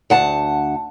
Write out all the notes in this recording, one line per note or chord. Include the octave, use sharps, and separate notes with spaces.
D2 F#5 A5